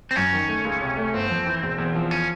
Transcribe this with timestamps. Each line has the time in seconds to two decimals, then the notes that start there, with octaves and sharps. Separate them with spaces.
0.11 C4
0.16 F#2 C#4
0.33 D#3
0.48 A3
0.64 C#2
0.82 C3
0.97 A3
1.14 G1 C4
1.31 F2
1.46 E3
1.62 E1
1.78 E2
1.95 F3
2.11 C#4